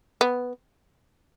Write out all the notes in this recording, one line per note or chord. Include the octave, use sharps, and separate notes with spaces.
B3